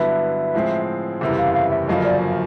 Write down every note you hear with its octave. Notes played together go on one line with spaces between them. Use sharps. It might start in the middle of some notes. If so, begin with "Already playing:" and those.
Already playing: G2 D3 F#3 B3 E4 E5
A2 F3 G#3 C4
F#1 E2 C3 E3 G3
F5
F5
E5
G1 F#2 C#3 F3 A#3 D#5
D5